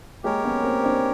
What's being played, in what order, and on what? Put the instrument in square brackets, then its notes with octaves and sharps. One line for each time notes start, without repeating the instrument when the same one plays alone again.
[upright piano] G#3 A#3 [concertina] G4 A#4 C#5
[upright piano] B3 C#4
A#3 C4
C4 D4